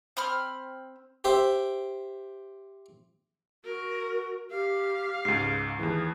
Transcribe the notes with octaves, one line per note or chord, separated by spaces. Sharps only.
C4 B5 F6
G4 C5 E5
F#4 A#4
G4 F5
C#2 G#2 C7
D#2 E3 G#4